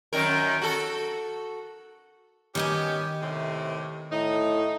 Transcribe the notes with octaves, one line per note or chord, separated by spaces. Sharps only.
F#2 D#3 A#4
F#4 A4
D#3 B3 C#4 G4 D#5 G#5
D#2 A2 C3
A2 D#4